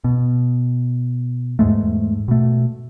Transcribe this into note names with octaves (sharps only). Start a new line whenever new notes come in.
B2
E2 G#2 G#3 A3
B2 A3